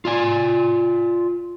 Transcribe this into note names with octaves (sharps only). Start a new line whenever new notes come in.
F4 D5 G#5